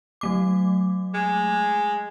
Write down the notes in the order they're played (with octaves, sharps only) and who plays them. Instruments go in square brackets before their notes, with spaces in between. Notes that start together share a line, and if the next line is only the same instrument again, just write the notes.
[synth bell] F#3 A3 D6
[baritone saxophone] G#3